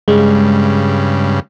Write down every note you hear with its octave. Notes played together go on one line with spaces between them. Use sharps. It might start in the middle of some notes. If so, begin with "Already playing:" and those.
G2 C#3 G#3